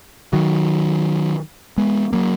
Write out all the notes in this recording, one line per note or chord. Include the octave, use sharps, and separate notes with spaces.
D#3 F#3
G#3 B3
F#3 A#3